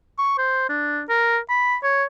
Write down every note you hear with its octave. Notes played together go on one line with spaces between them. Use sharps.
C#6
C5
D4
A#4
B5
C#5